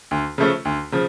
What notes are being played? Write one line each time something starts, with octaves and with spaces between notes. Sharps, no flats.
D2
C#3 F3 A3 C#4
D2
C#3 F3